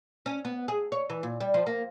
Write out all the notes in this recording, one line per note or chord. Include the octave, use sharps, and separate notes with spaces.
C#4
B3
G#4
C#5
E3
A#2
G3
F3
A#3